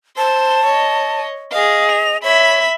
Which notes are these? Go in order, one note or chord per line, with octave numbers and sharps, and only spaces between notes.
C5 A5
C#5 D#5
G#4 D#5 F5
F7
C#5 E5 B5